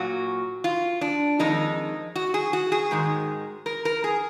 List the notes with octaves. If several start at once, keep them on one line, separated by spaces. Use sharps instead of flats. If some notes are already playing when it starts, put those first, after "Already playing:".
Already playing: A#2 F#3 F#4
F4
D4
F2 D#3 G#3 D#4
F#4
G#4
F#4
G#4
G#2 D#3 G#3
A#4
A#4
G#4